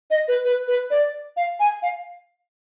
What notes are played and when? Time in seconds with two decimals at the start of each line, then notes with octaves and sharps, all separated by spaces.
0.11 D#5
0.28 B4
0.45 B4
0.68 B4
0.91 D5
1.37 F5
1.60 G#5
1.83 F5